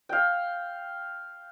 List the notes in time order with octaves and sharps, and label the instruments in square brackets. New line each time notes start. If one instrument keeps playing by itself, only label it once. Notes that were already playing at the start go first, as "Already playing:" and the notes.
[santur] F5 G5